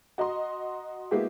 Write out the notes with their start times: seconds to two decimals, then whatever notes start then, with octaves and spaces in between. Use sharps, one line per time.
0.18 F#4 D#5 A#5 C6
1.11 G#3 A#3 B3 E4 F#4 G4